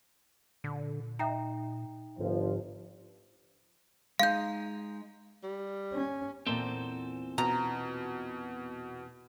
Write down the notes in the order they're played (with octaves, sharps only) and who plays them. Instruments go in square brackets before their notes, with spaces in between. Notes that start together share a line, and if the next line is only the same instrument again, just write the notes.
[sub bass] A#2 [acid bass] D3
[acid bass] D#4 [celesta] E5 G5 A#5
[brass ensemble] G1 F3 [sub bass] G#2
[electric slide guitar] G#3 D#4 [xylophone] F5 G6
[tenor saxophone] G3
[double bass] C#4
[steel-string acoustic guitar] E2 A#2 [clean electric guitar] C4 A4 C5
[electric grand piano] B2 [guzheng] A#5